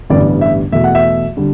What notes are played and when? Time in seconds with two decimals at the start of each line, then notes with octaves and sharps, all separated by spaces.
0.10 A1 G2 D3 G3 B3 D5
0.41 E5
0.72 E2 B2 A3 E5
0.84 F#5
0.95 E5
1.37 D3 G3